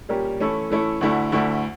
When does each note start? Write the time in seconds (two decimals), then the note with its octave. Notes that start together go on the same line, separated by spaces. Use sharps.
0.09 A#2 G3 C#4 G4 A#4
0.40 E3 A3 C#4 E4 A4
0.70 E3 A3 C#4 E4 A4
1.01 D2 D3 A3 E4
1.32 D2 D3 A3 E4